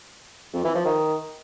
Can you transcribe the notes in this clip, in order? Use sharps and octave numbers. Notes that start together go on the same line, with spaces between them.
F2
E3
F3
D#3